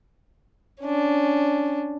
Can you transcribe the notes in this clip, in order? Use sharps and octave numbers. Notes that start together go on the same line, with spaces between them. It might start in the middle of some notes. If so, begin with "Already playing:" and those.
C#4 D4